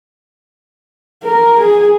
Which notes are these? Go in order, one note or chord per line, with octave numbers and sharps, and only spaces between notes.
A#4
G#4